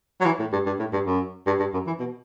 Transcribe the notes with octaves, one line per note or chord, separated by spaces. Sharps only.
F#3
E3
A2
G2
G2
A2
G2
F#2
G2
G2
F#2
E3
B2